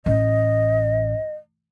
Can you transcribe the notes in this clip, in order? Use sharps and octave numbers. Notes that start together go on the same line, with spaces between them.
A1 D#5